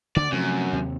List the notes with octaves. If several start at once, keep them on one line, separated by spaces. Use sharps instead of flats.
D2 D3 D5
F#2 C3 F3 A3
D#2 C3